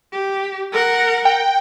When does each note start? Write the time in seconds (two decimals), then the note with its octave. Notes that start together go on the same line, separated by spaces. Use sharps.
0.12 G4
0.72 A#4 F#5
1.25 G5